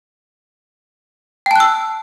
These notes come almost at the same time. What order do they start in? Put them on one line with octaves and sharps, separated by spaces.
G5 A5 F#6 E6